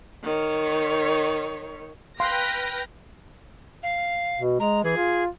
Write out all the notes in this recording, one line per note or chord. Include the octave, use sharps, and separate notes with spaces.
D#3 C#5
B4 F5 G5 C6 F6 A#6 B6
F5
B2
G#3 A#5
E3 G#4
F4